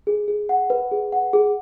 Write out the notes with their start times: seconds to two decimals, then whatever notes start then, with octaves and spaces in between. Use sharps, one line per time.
0.07 G#4
0.28 G#4
0.49 F#5
0.70 B4
0.91 G#4
1.12 F#5
1.33 G#4